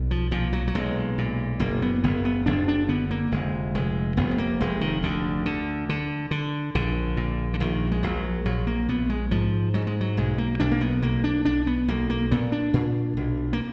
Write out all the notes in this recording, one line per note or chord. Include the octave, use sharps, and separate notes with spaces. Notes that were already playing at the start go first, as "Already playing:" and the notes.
Already playing: B1
F3
A#2 F3
F#3
F#3
B1 G#3
A#2
F#1 A#3
B3
F#1 B3
B3
F#1 D4
D4
D3 B3
A#3
F1 G#3
F1 G#3
F1 B3
G#3
A#3
F1 G#3
D#3
D2 D3
D3
D3
D3
A#1 D3
A#2
D3
A#1 D#3
G#3
A#1 F#3
A#1 F#3
A#3
A#1 B3
G#3
G#2 F3
G#2 F#3
G#3
F#3
B1 G#3
A#3
B1 D4
A#3
B3
B1 A#3
D4
B1 D4
B3
B1 A#3
A#3
A#2 B3
D4
A#2
B1
A#3